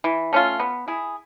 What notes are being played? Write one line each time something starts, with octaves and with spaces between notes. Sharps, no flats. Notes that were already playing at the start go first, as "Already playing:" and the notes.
E3
A3 C#4 F4
B3
E4 G#4